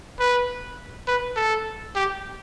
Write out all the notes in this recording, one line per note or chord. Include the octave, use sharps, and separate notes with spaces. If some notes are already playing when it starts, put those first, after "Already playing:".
B4
B4
A4
G4